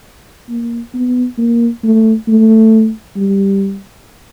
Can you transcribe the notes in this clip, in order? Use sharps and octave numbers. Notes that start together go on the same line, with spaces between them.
A#3
B3
A#3
A3
A3
G3